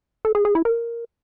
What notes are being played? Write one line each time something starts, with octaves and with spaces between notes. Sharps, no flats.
A4
G#4
G#4
E4
A#4